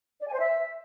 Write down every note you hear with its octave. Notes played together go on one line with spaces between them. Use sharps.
D5
G#5
C5
E5